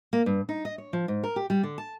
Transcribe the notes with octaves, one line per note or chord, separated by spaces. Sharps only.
A#3
G2
D#4
D#5
C#5
F3
G#2
A#4
G4
G3
D3
A5